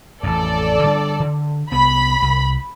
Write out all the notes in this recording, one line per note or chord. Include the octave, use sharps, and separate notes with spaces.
A1 F2 A4 D5
D3 G3 D4
D3
C2 B3 B5
C2